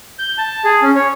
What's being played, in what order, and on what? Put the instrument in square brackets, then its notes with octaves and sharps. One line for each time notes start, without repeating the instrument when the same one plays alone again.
[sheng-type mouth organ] G6
A5
G#4
C#4
C#5